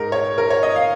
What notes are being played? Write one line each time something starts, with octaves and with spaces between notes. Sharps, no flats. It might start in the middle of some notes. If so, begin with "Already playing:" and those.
Already playing: G#2 G#3 D#4 A#4
C#5
A#4
C#5
D#5
F5